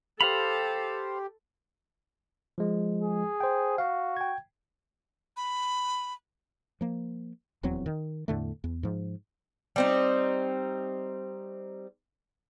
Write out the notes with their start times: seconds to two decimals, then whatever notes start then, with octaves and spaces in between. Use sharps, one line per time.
0.21 G4 A4 C5 F5 B5 F7
2.58 F3 G#3
3.02 G#4
3.41 C5 G5
3.78 F#4 F5
4.17 G5 G#6
5.37 B5
6.81 F3 A#3
7.63 D#1 E2 F#3 C4
7.86 D#3
8.28 E2 A2 D3 A3
8.64 E2
8.83 G#2 F3
9.76 G3 C4 D#4